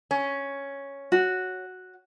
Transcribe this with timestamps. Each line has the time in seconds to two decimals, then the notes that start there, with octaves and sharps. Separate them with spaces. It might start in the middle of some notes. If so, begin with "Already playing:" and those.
0.11 C#4
1.12 F#4